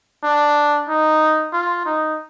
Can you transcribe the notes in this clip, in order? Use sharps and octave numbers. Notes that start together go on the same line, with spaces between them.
D4
D#4
F4
D#4